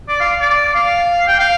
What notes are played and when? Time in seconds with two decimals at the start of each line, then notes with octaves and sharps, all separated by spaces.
0.09 D5
0.20 F5
0.41 D5
0.75 F5
1.28 G5
1.40 F5